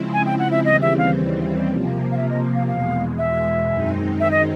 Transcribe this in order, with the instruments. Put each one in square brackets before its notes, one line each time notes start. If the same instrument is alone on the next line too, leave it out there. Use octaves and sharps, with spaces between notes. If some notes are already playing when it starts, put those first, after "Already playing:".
Already playing: [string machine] C#3 F3 G#3 C4 E4
[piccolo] G#5
G5
F#5
E5
[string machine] D#2 C#3 E3 G3 C4 [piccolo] D#5
[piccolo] E5
F5
[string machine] C3 F3 A#3
[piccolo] F5
E5
D#5
F5
[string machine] E2 B2 G#3 [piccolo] F5
[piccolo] E5
[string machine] F#2 D#3 G#3 C4 D#4
[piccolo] E5
D#5